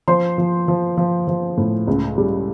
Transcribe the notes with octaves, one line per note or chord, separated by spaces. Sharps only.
F3 C5 C6
F3
F3
F3
F3
A2
C#2
G3